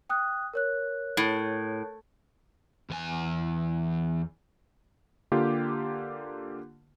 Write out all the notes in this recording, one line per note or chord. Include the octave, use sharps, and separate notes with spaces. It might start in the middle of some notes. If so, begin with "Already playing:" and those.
G5 D#6 F#6
A#4 C#5 F#6
A2
E2 G#5
D3 A#3 F4 G4